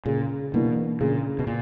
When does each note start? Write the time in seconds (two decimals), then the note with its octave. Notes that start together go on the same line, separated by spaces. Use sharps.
0.06 A#2 C#3
0.53 B2 E3 A#3 D4 A#4
1.01 A#2 C#3
1.39 B2
1.47 A#2